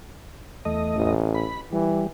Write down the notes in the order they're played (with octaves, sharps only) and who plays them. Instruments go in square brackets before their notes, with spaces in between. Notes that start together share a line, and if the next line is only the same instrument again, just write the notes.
[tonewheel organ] E2 A3 D#5
[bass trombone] A1
[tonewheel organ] B5
[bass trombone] E3 [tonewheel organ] G3